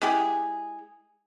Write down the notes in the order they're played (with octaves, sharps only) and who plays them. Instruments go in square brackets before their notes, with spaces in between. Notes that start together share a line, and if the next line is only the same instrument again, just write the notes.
[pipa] G#3 E4 G4 G#4